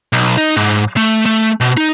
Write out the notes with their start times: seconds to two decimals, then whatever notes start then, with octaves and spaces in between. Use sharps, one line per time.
0.13 B1
0.37 D#4
0.57 G#2
0.97 A3
1.26 A3
1.61 B2
1.77 D#4